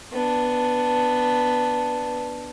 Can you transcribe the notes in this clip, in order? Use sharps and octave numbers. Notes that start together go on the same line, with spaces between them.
B3 D4